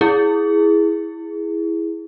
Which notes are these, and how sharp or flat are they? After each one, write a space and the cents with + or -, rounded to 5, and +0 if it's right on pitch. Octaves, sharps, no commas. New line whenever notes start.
E4 +0 G#4 +0